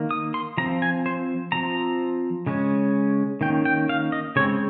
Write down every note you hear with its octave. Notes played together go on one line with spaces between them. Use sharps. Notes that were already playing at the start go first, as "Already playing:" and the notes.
Already playing: D#3 A#3
D#6
C6
F3 C4 A#5
G#5
C5
F3 C4 A#5
C#3 G#3 C#4
D#3 A#3 C#4 G5
G5
F5
D#5
C#3 G#3 C4 C#5